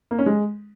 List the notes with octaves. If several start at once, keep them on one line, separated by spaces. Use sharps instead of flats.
A#3
C#4
G#3